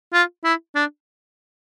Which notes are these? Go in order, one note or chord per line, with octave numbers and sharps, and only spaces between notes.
F4
E4
D4